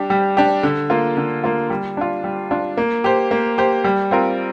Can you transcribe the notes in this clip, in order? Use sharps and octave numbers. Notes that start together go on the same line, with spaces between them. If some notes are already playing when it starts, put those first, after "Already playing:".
Already playing: G3 D4 G4
G3
D4 G4
D3
A#3 F4
D3
A#3 F4
G3
D4 F4
G3
D4 F4
A#3
G4 C5
A#3
G4 C5
G3
C4 F4 A#4